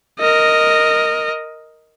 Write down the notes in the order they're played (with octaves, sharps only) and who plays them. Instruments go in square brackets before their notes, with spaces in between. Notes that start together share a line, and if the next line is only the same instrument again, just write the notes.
[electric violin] A#4 D#5